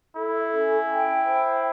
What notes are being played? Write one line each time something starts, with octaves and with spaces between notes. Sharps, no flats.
E4 A4
C#4
G5
C5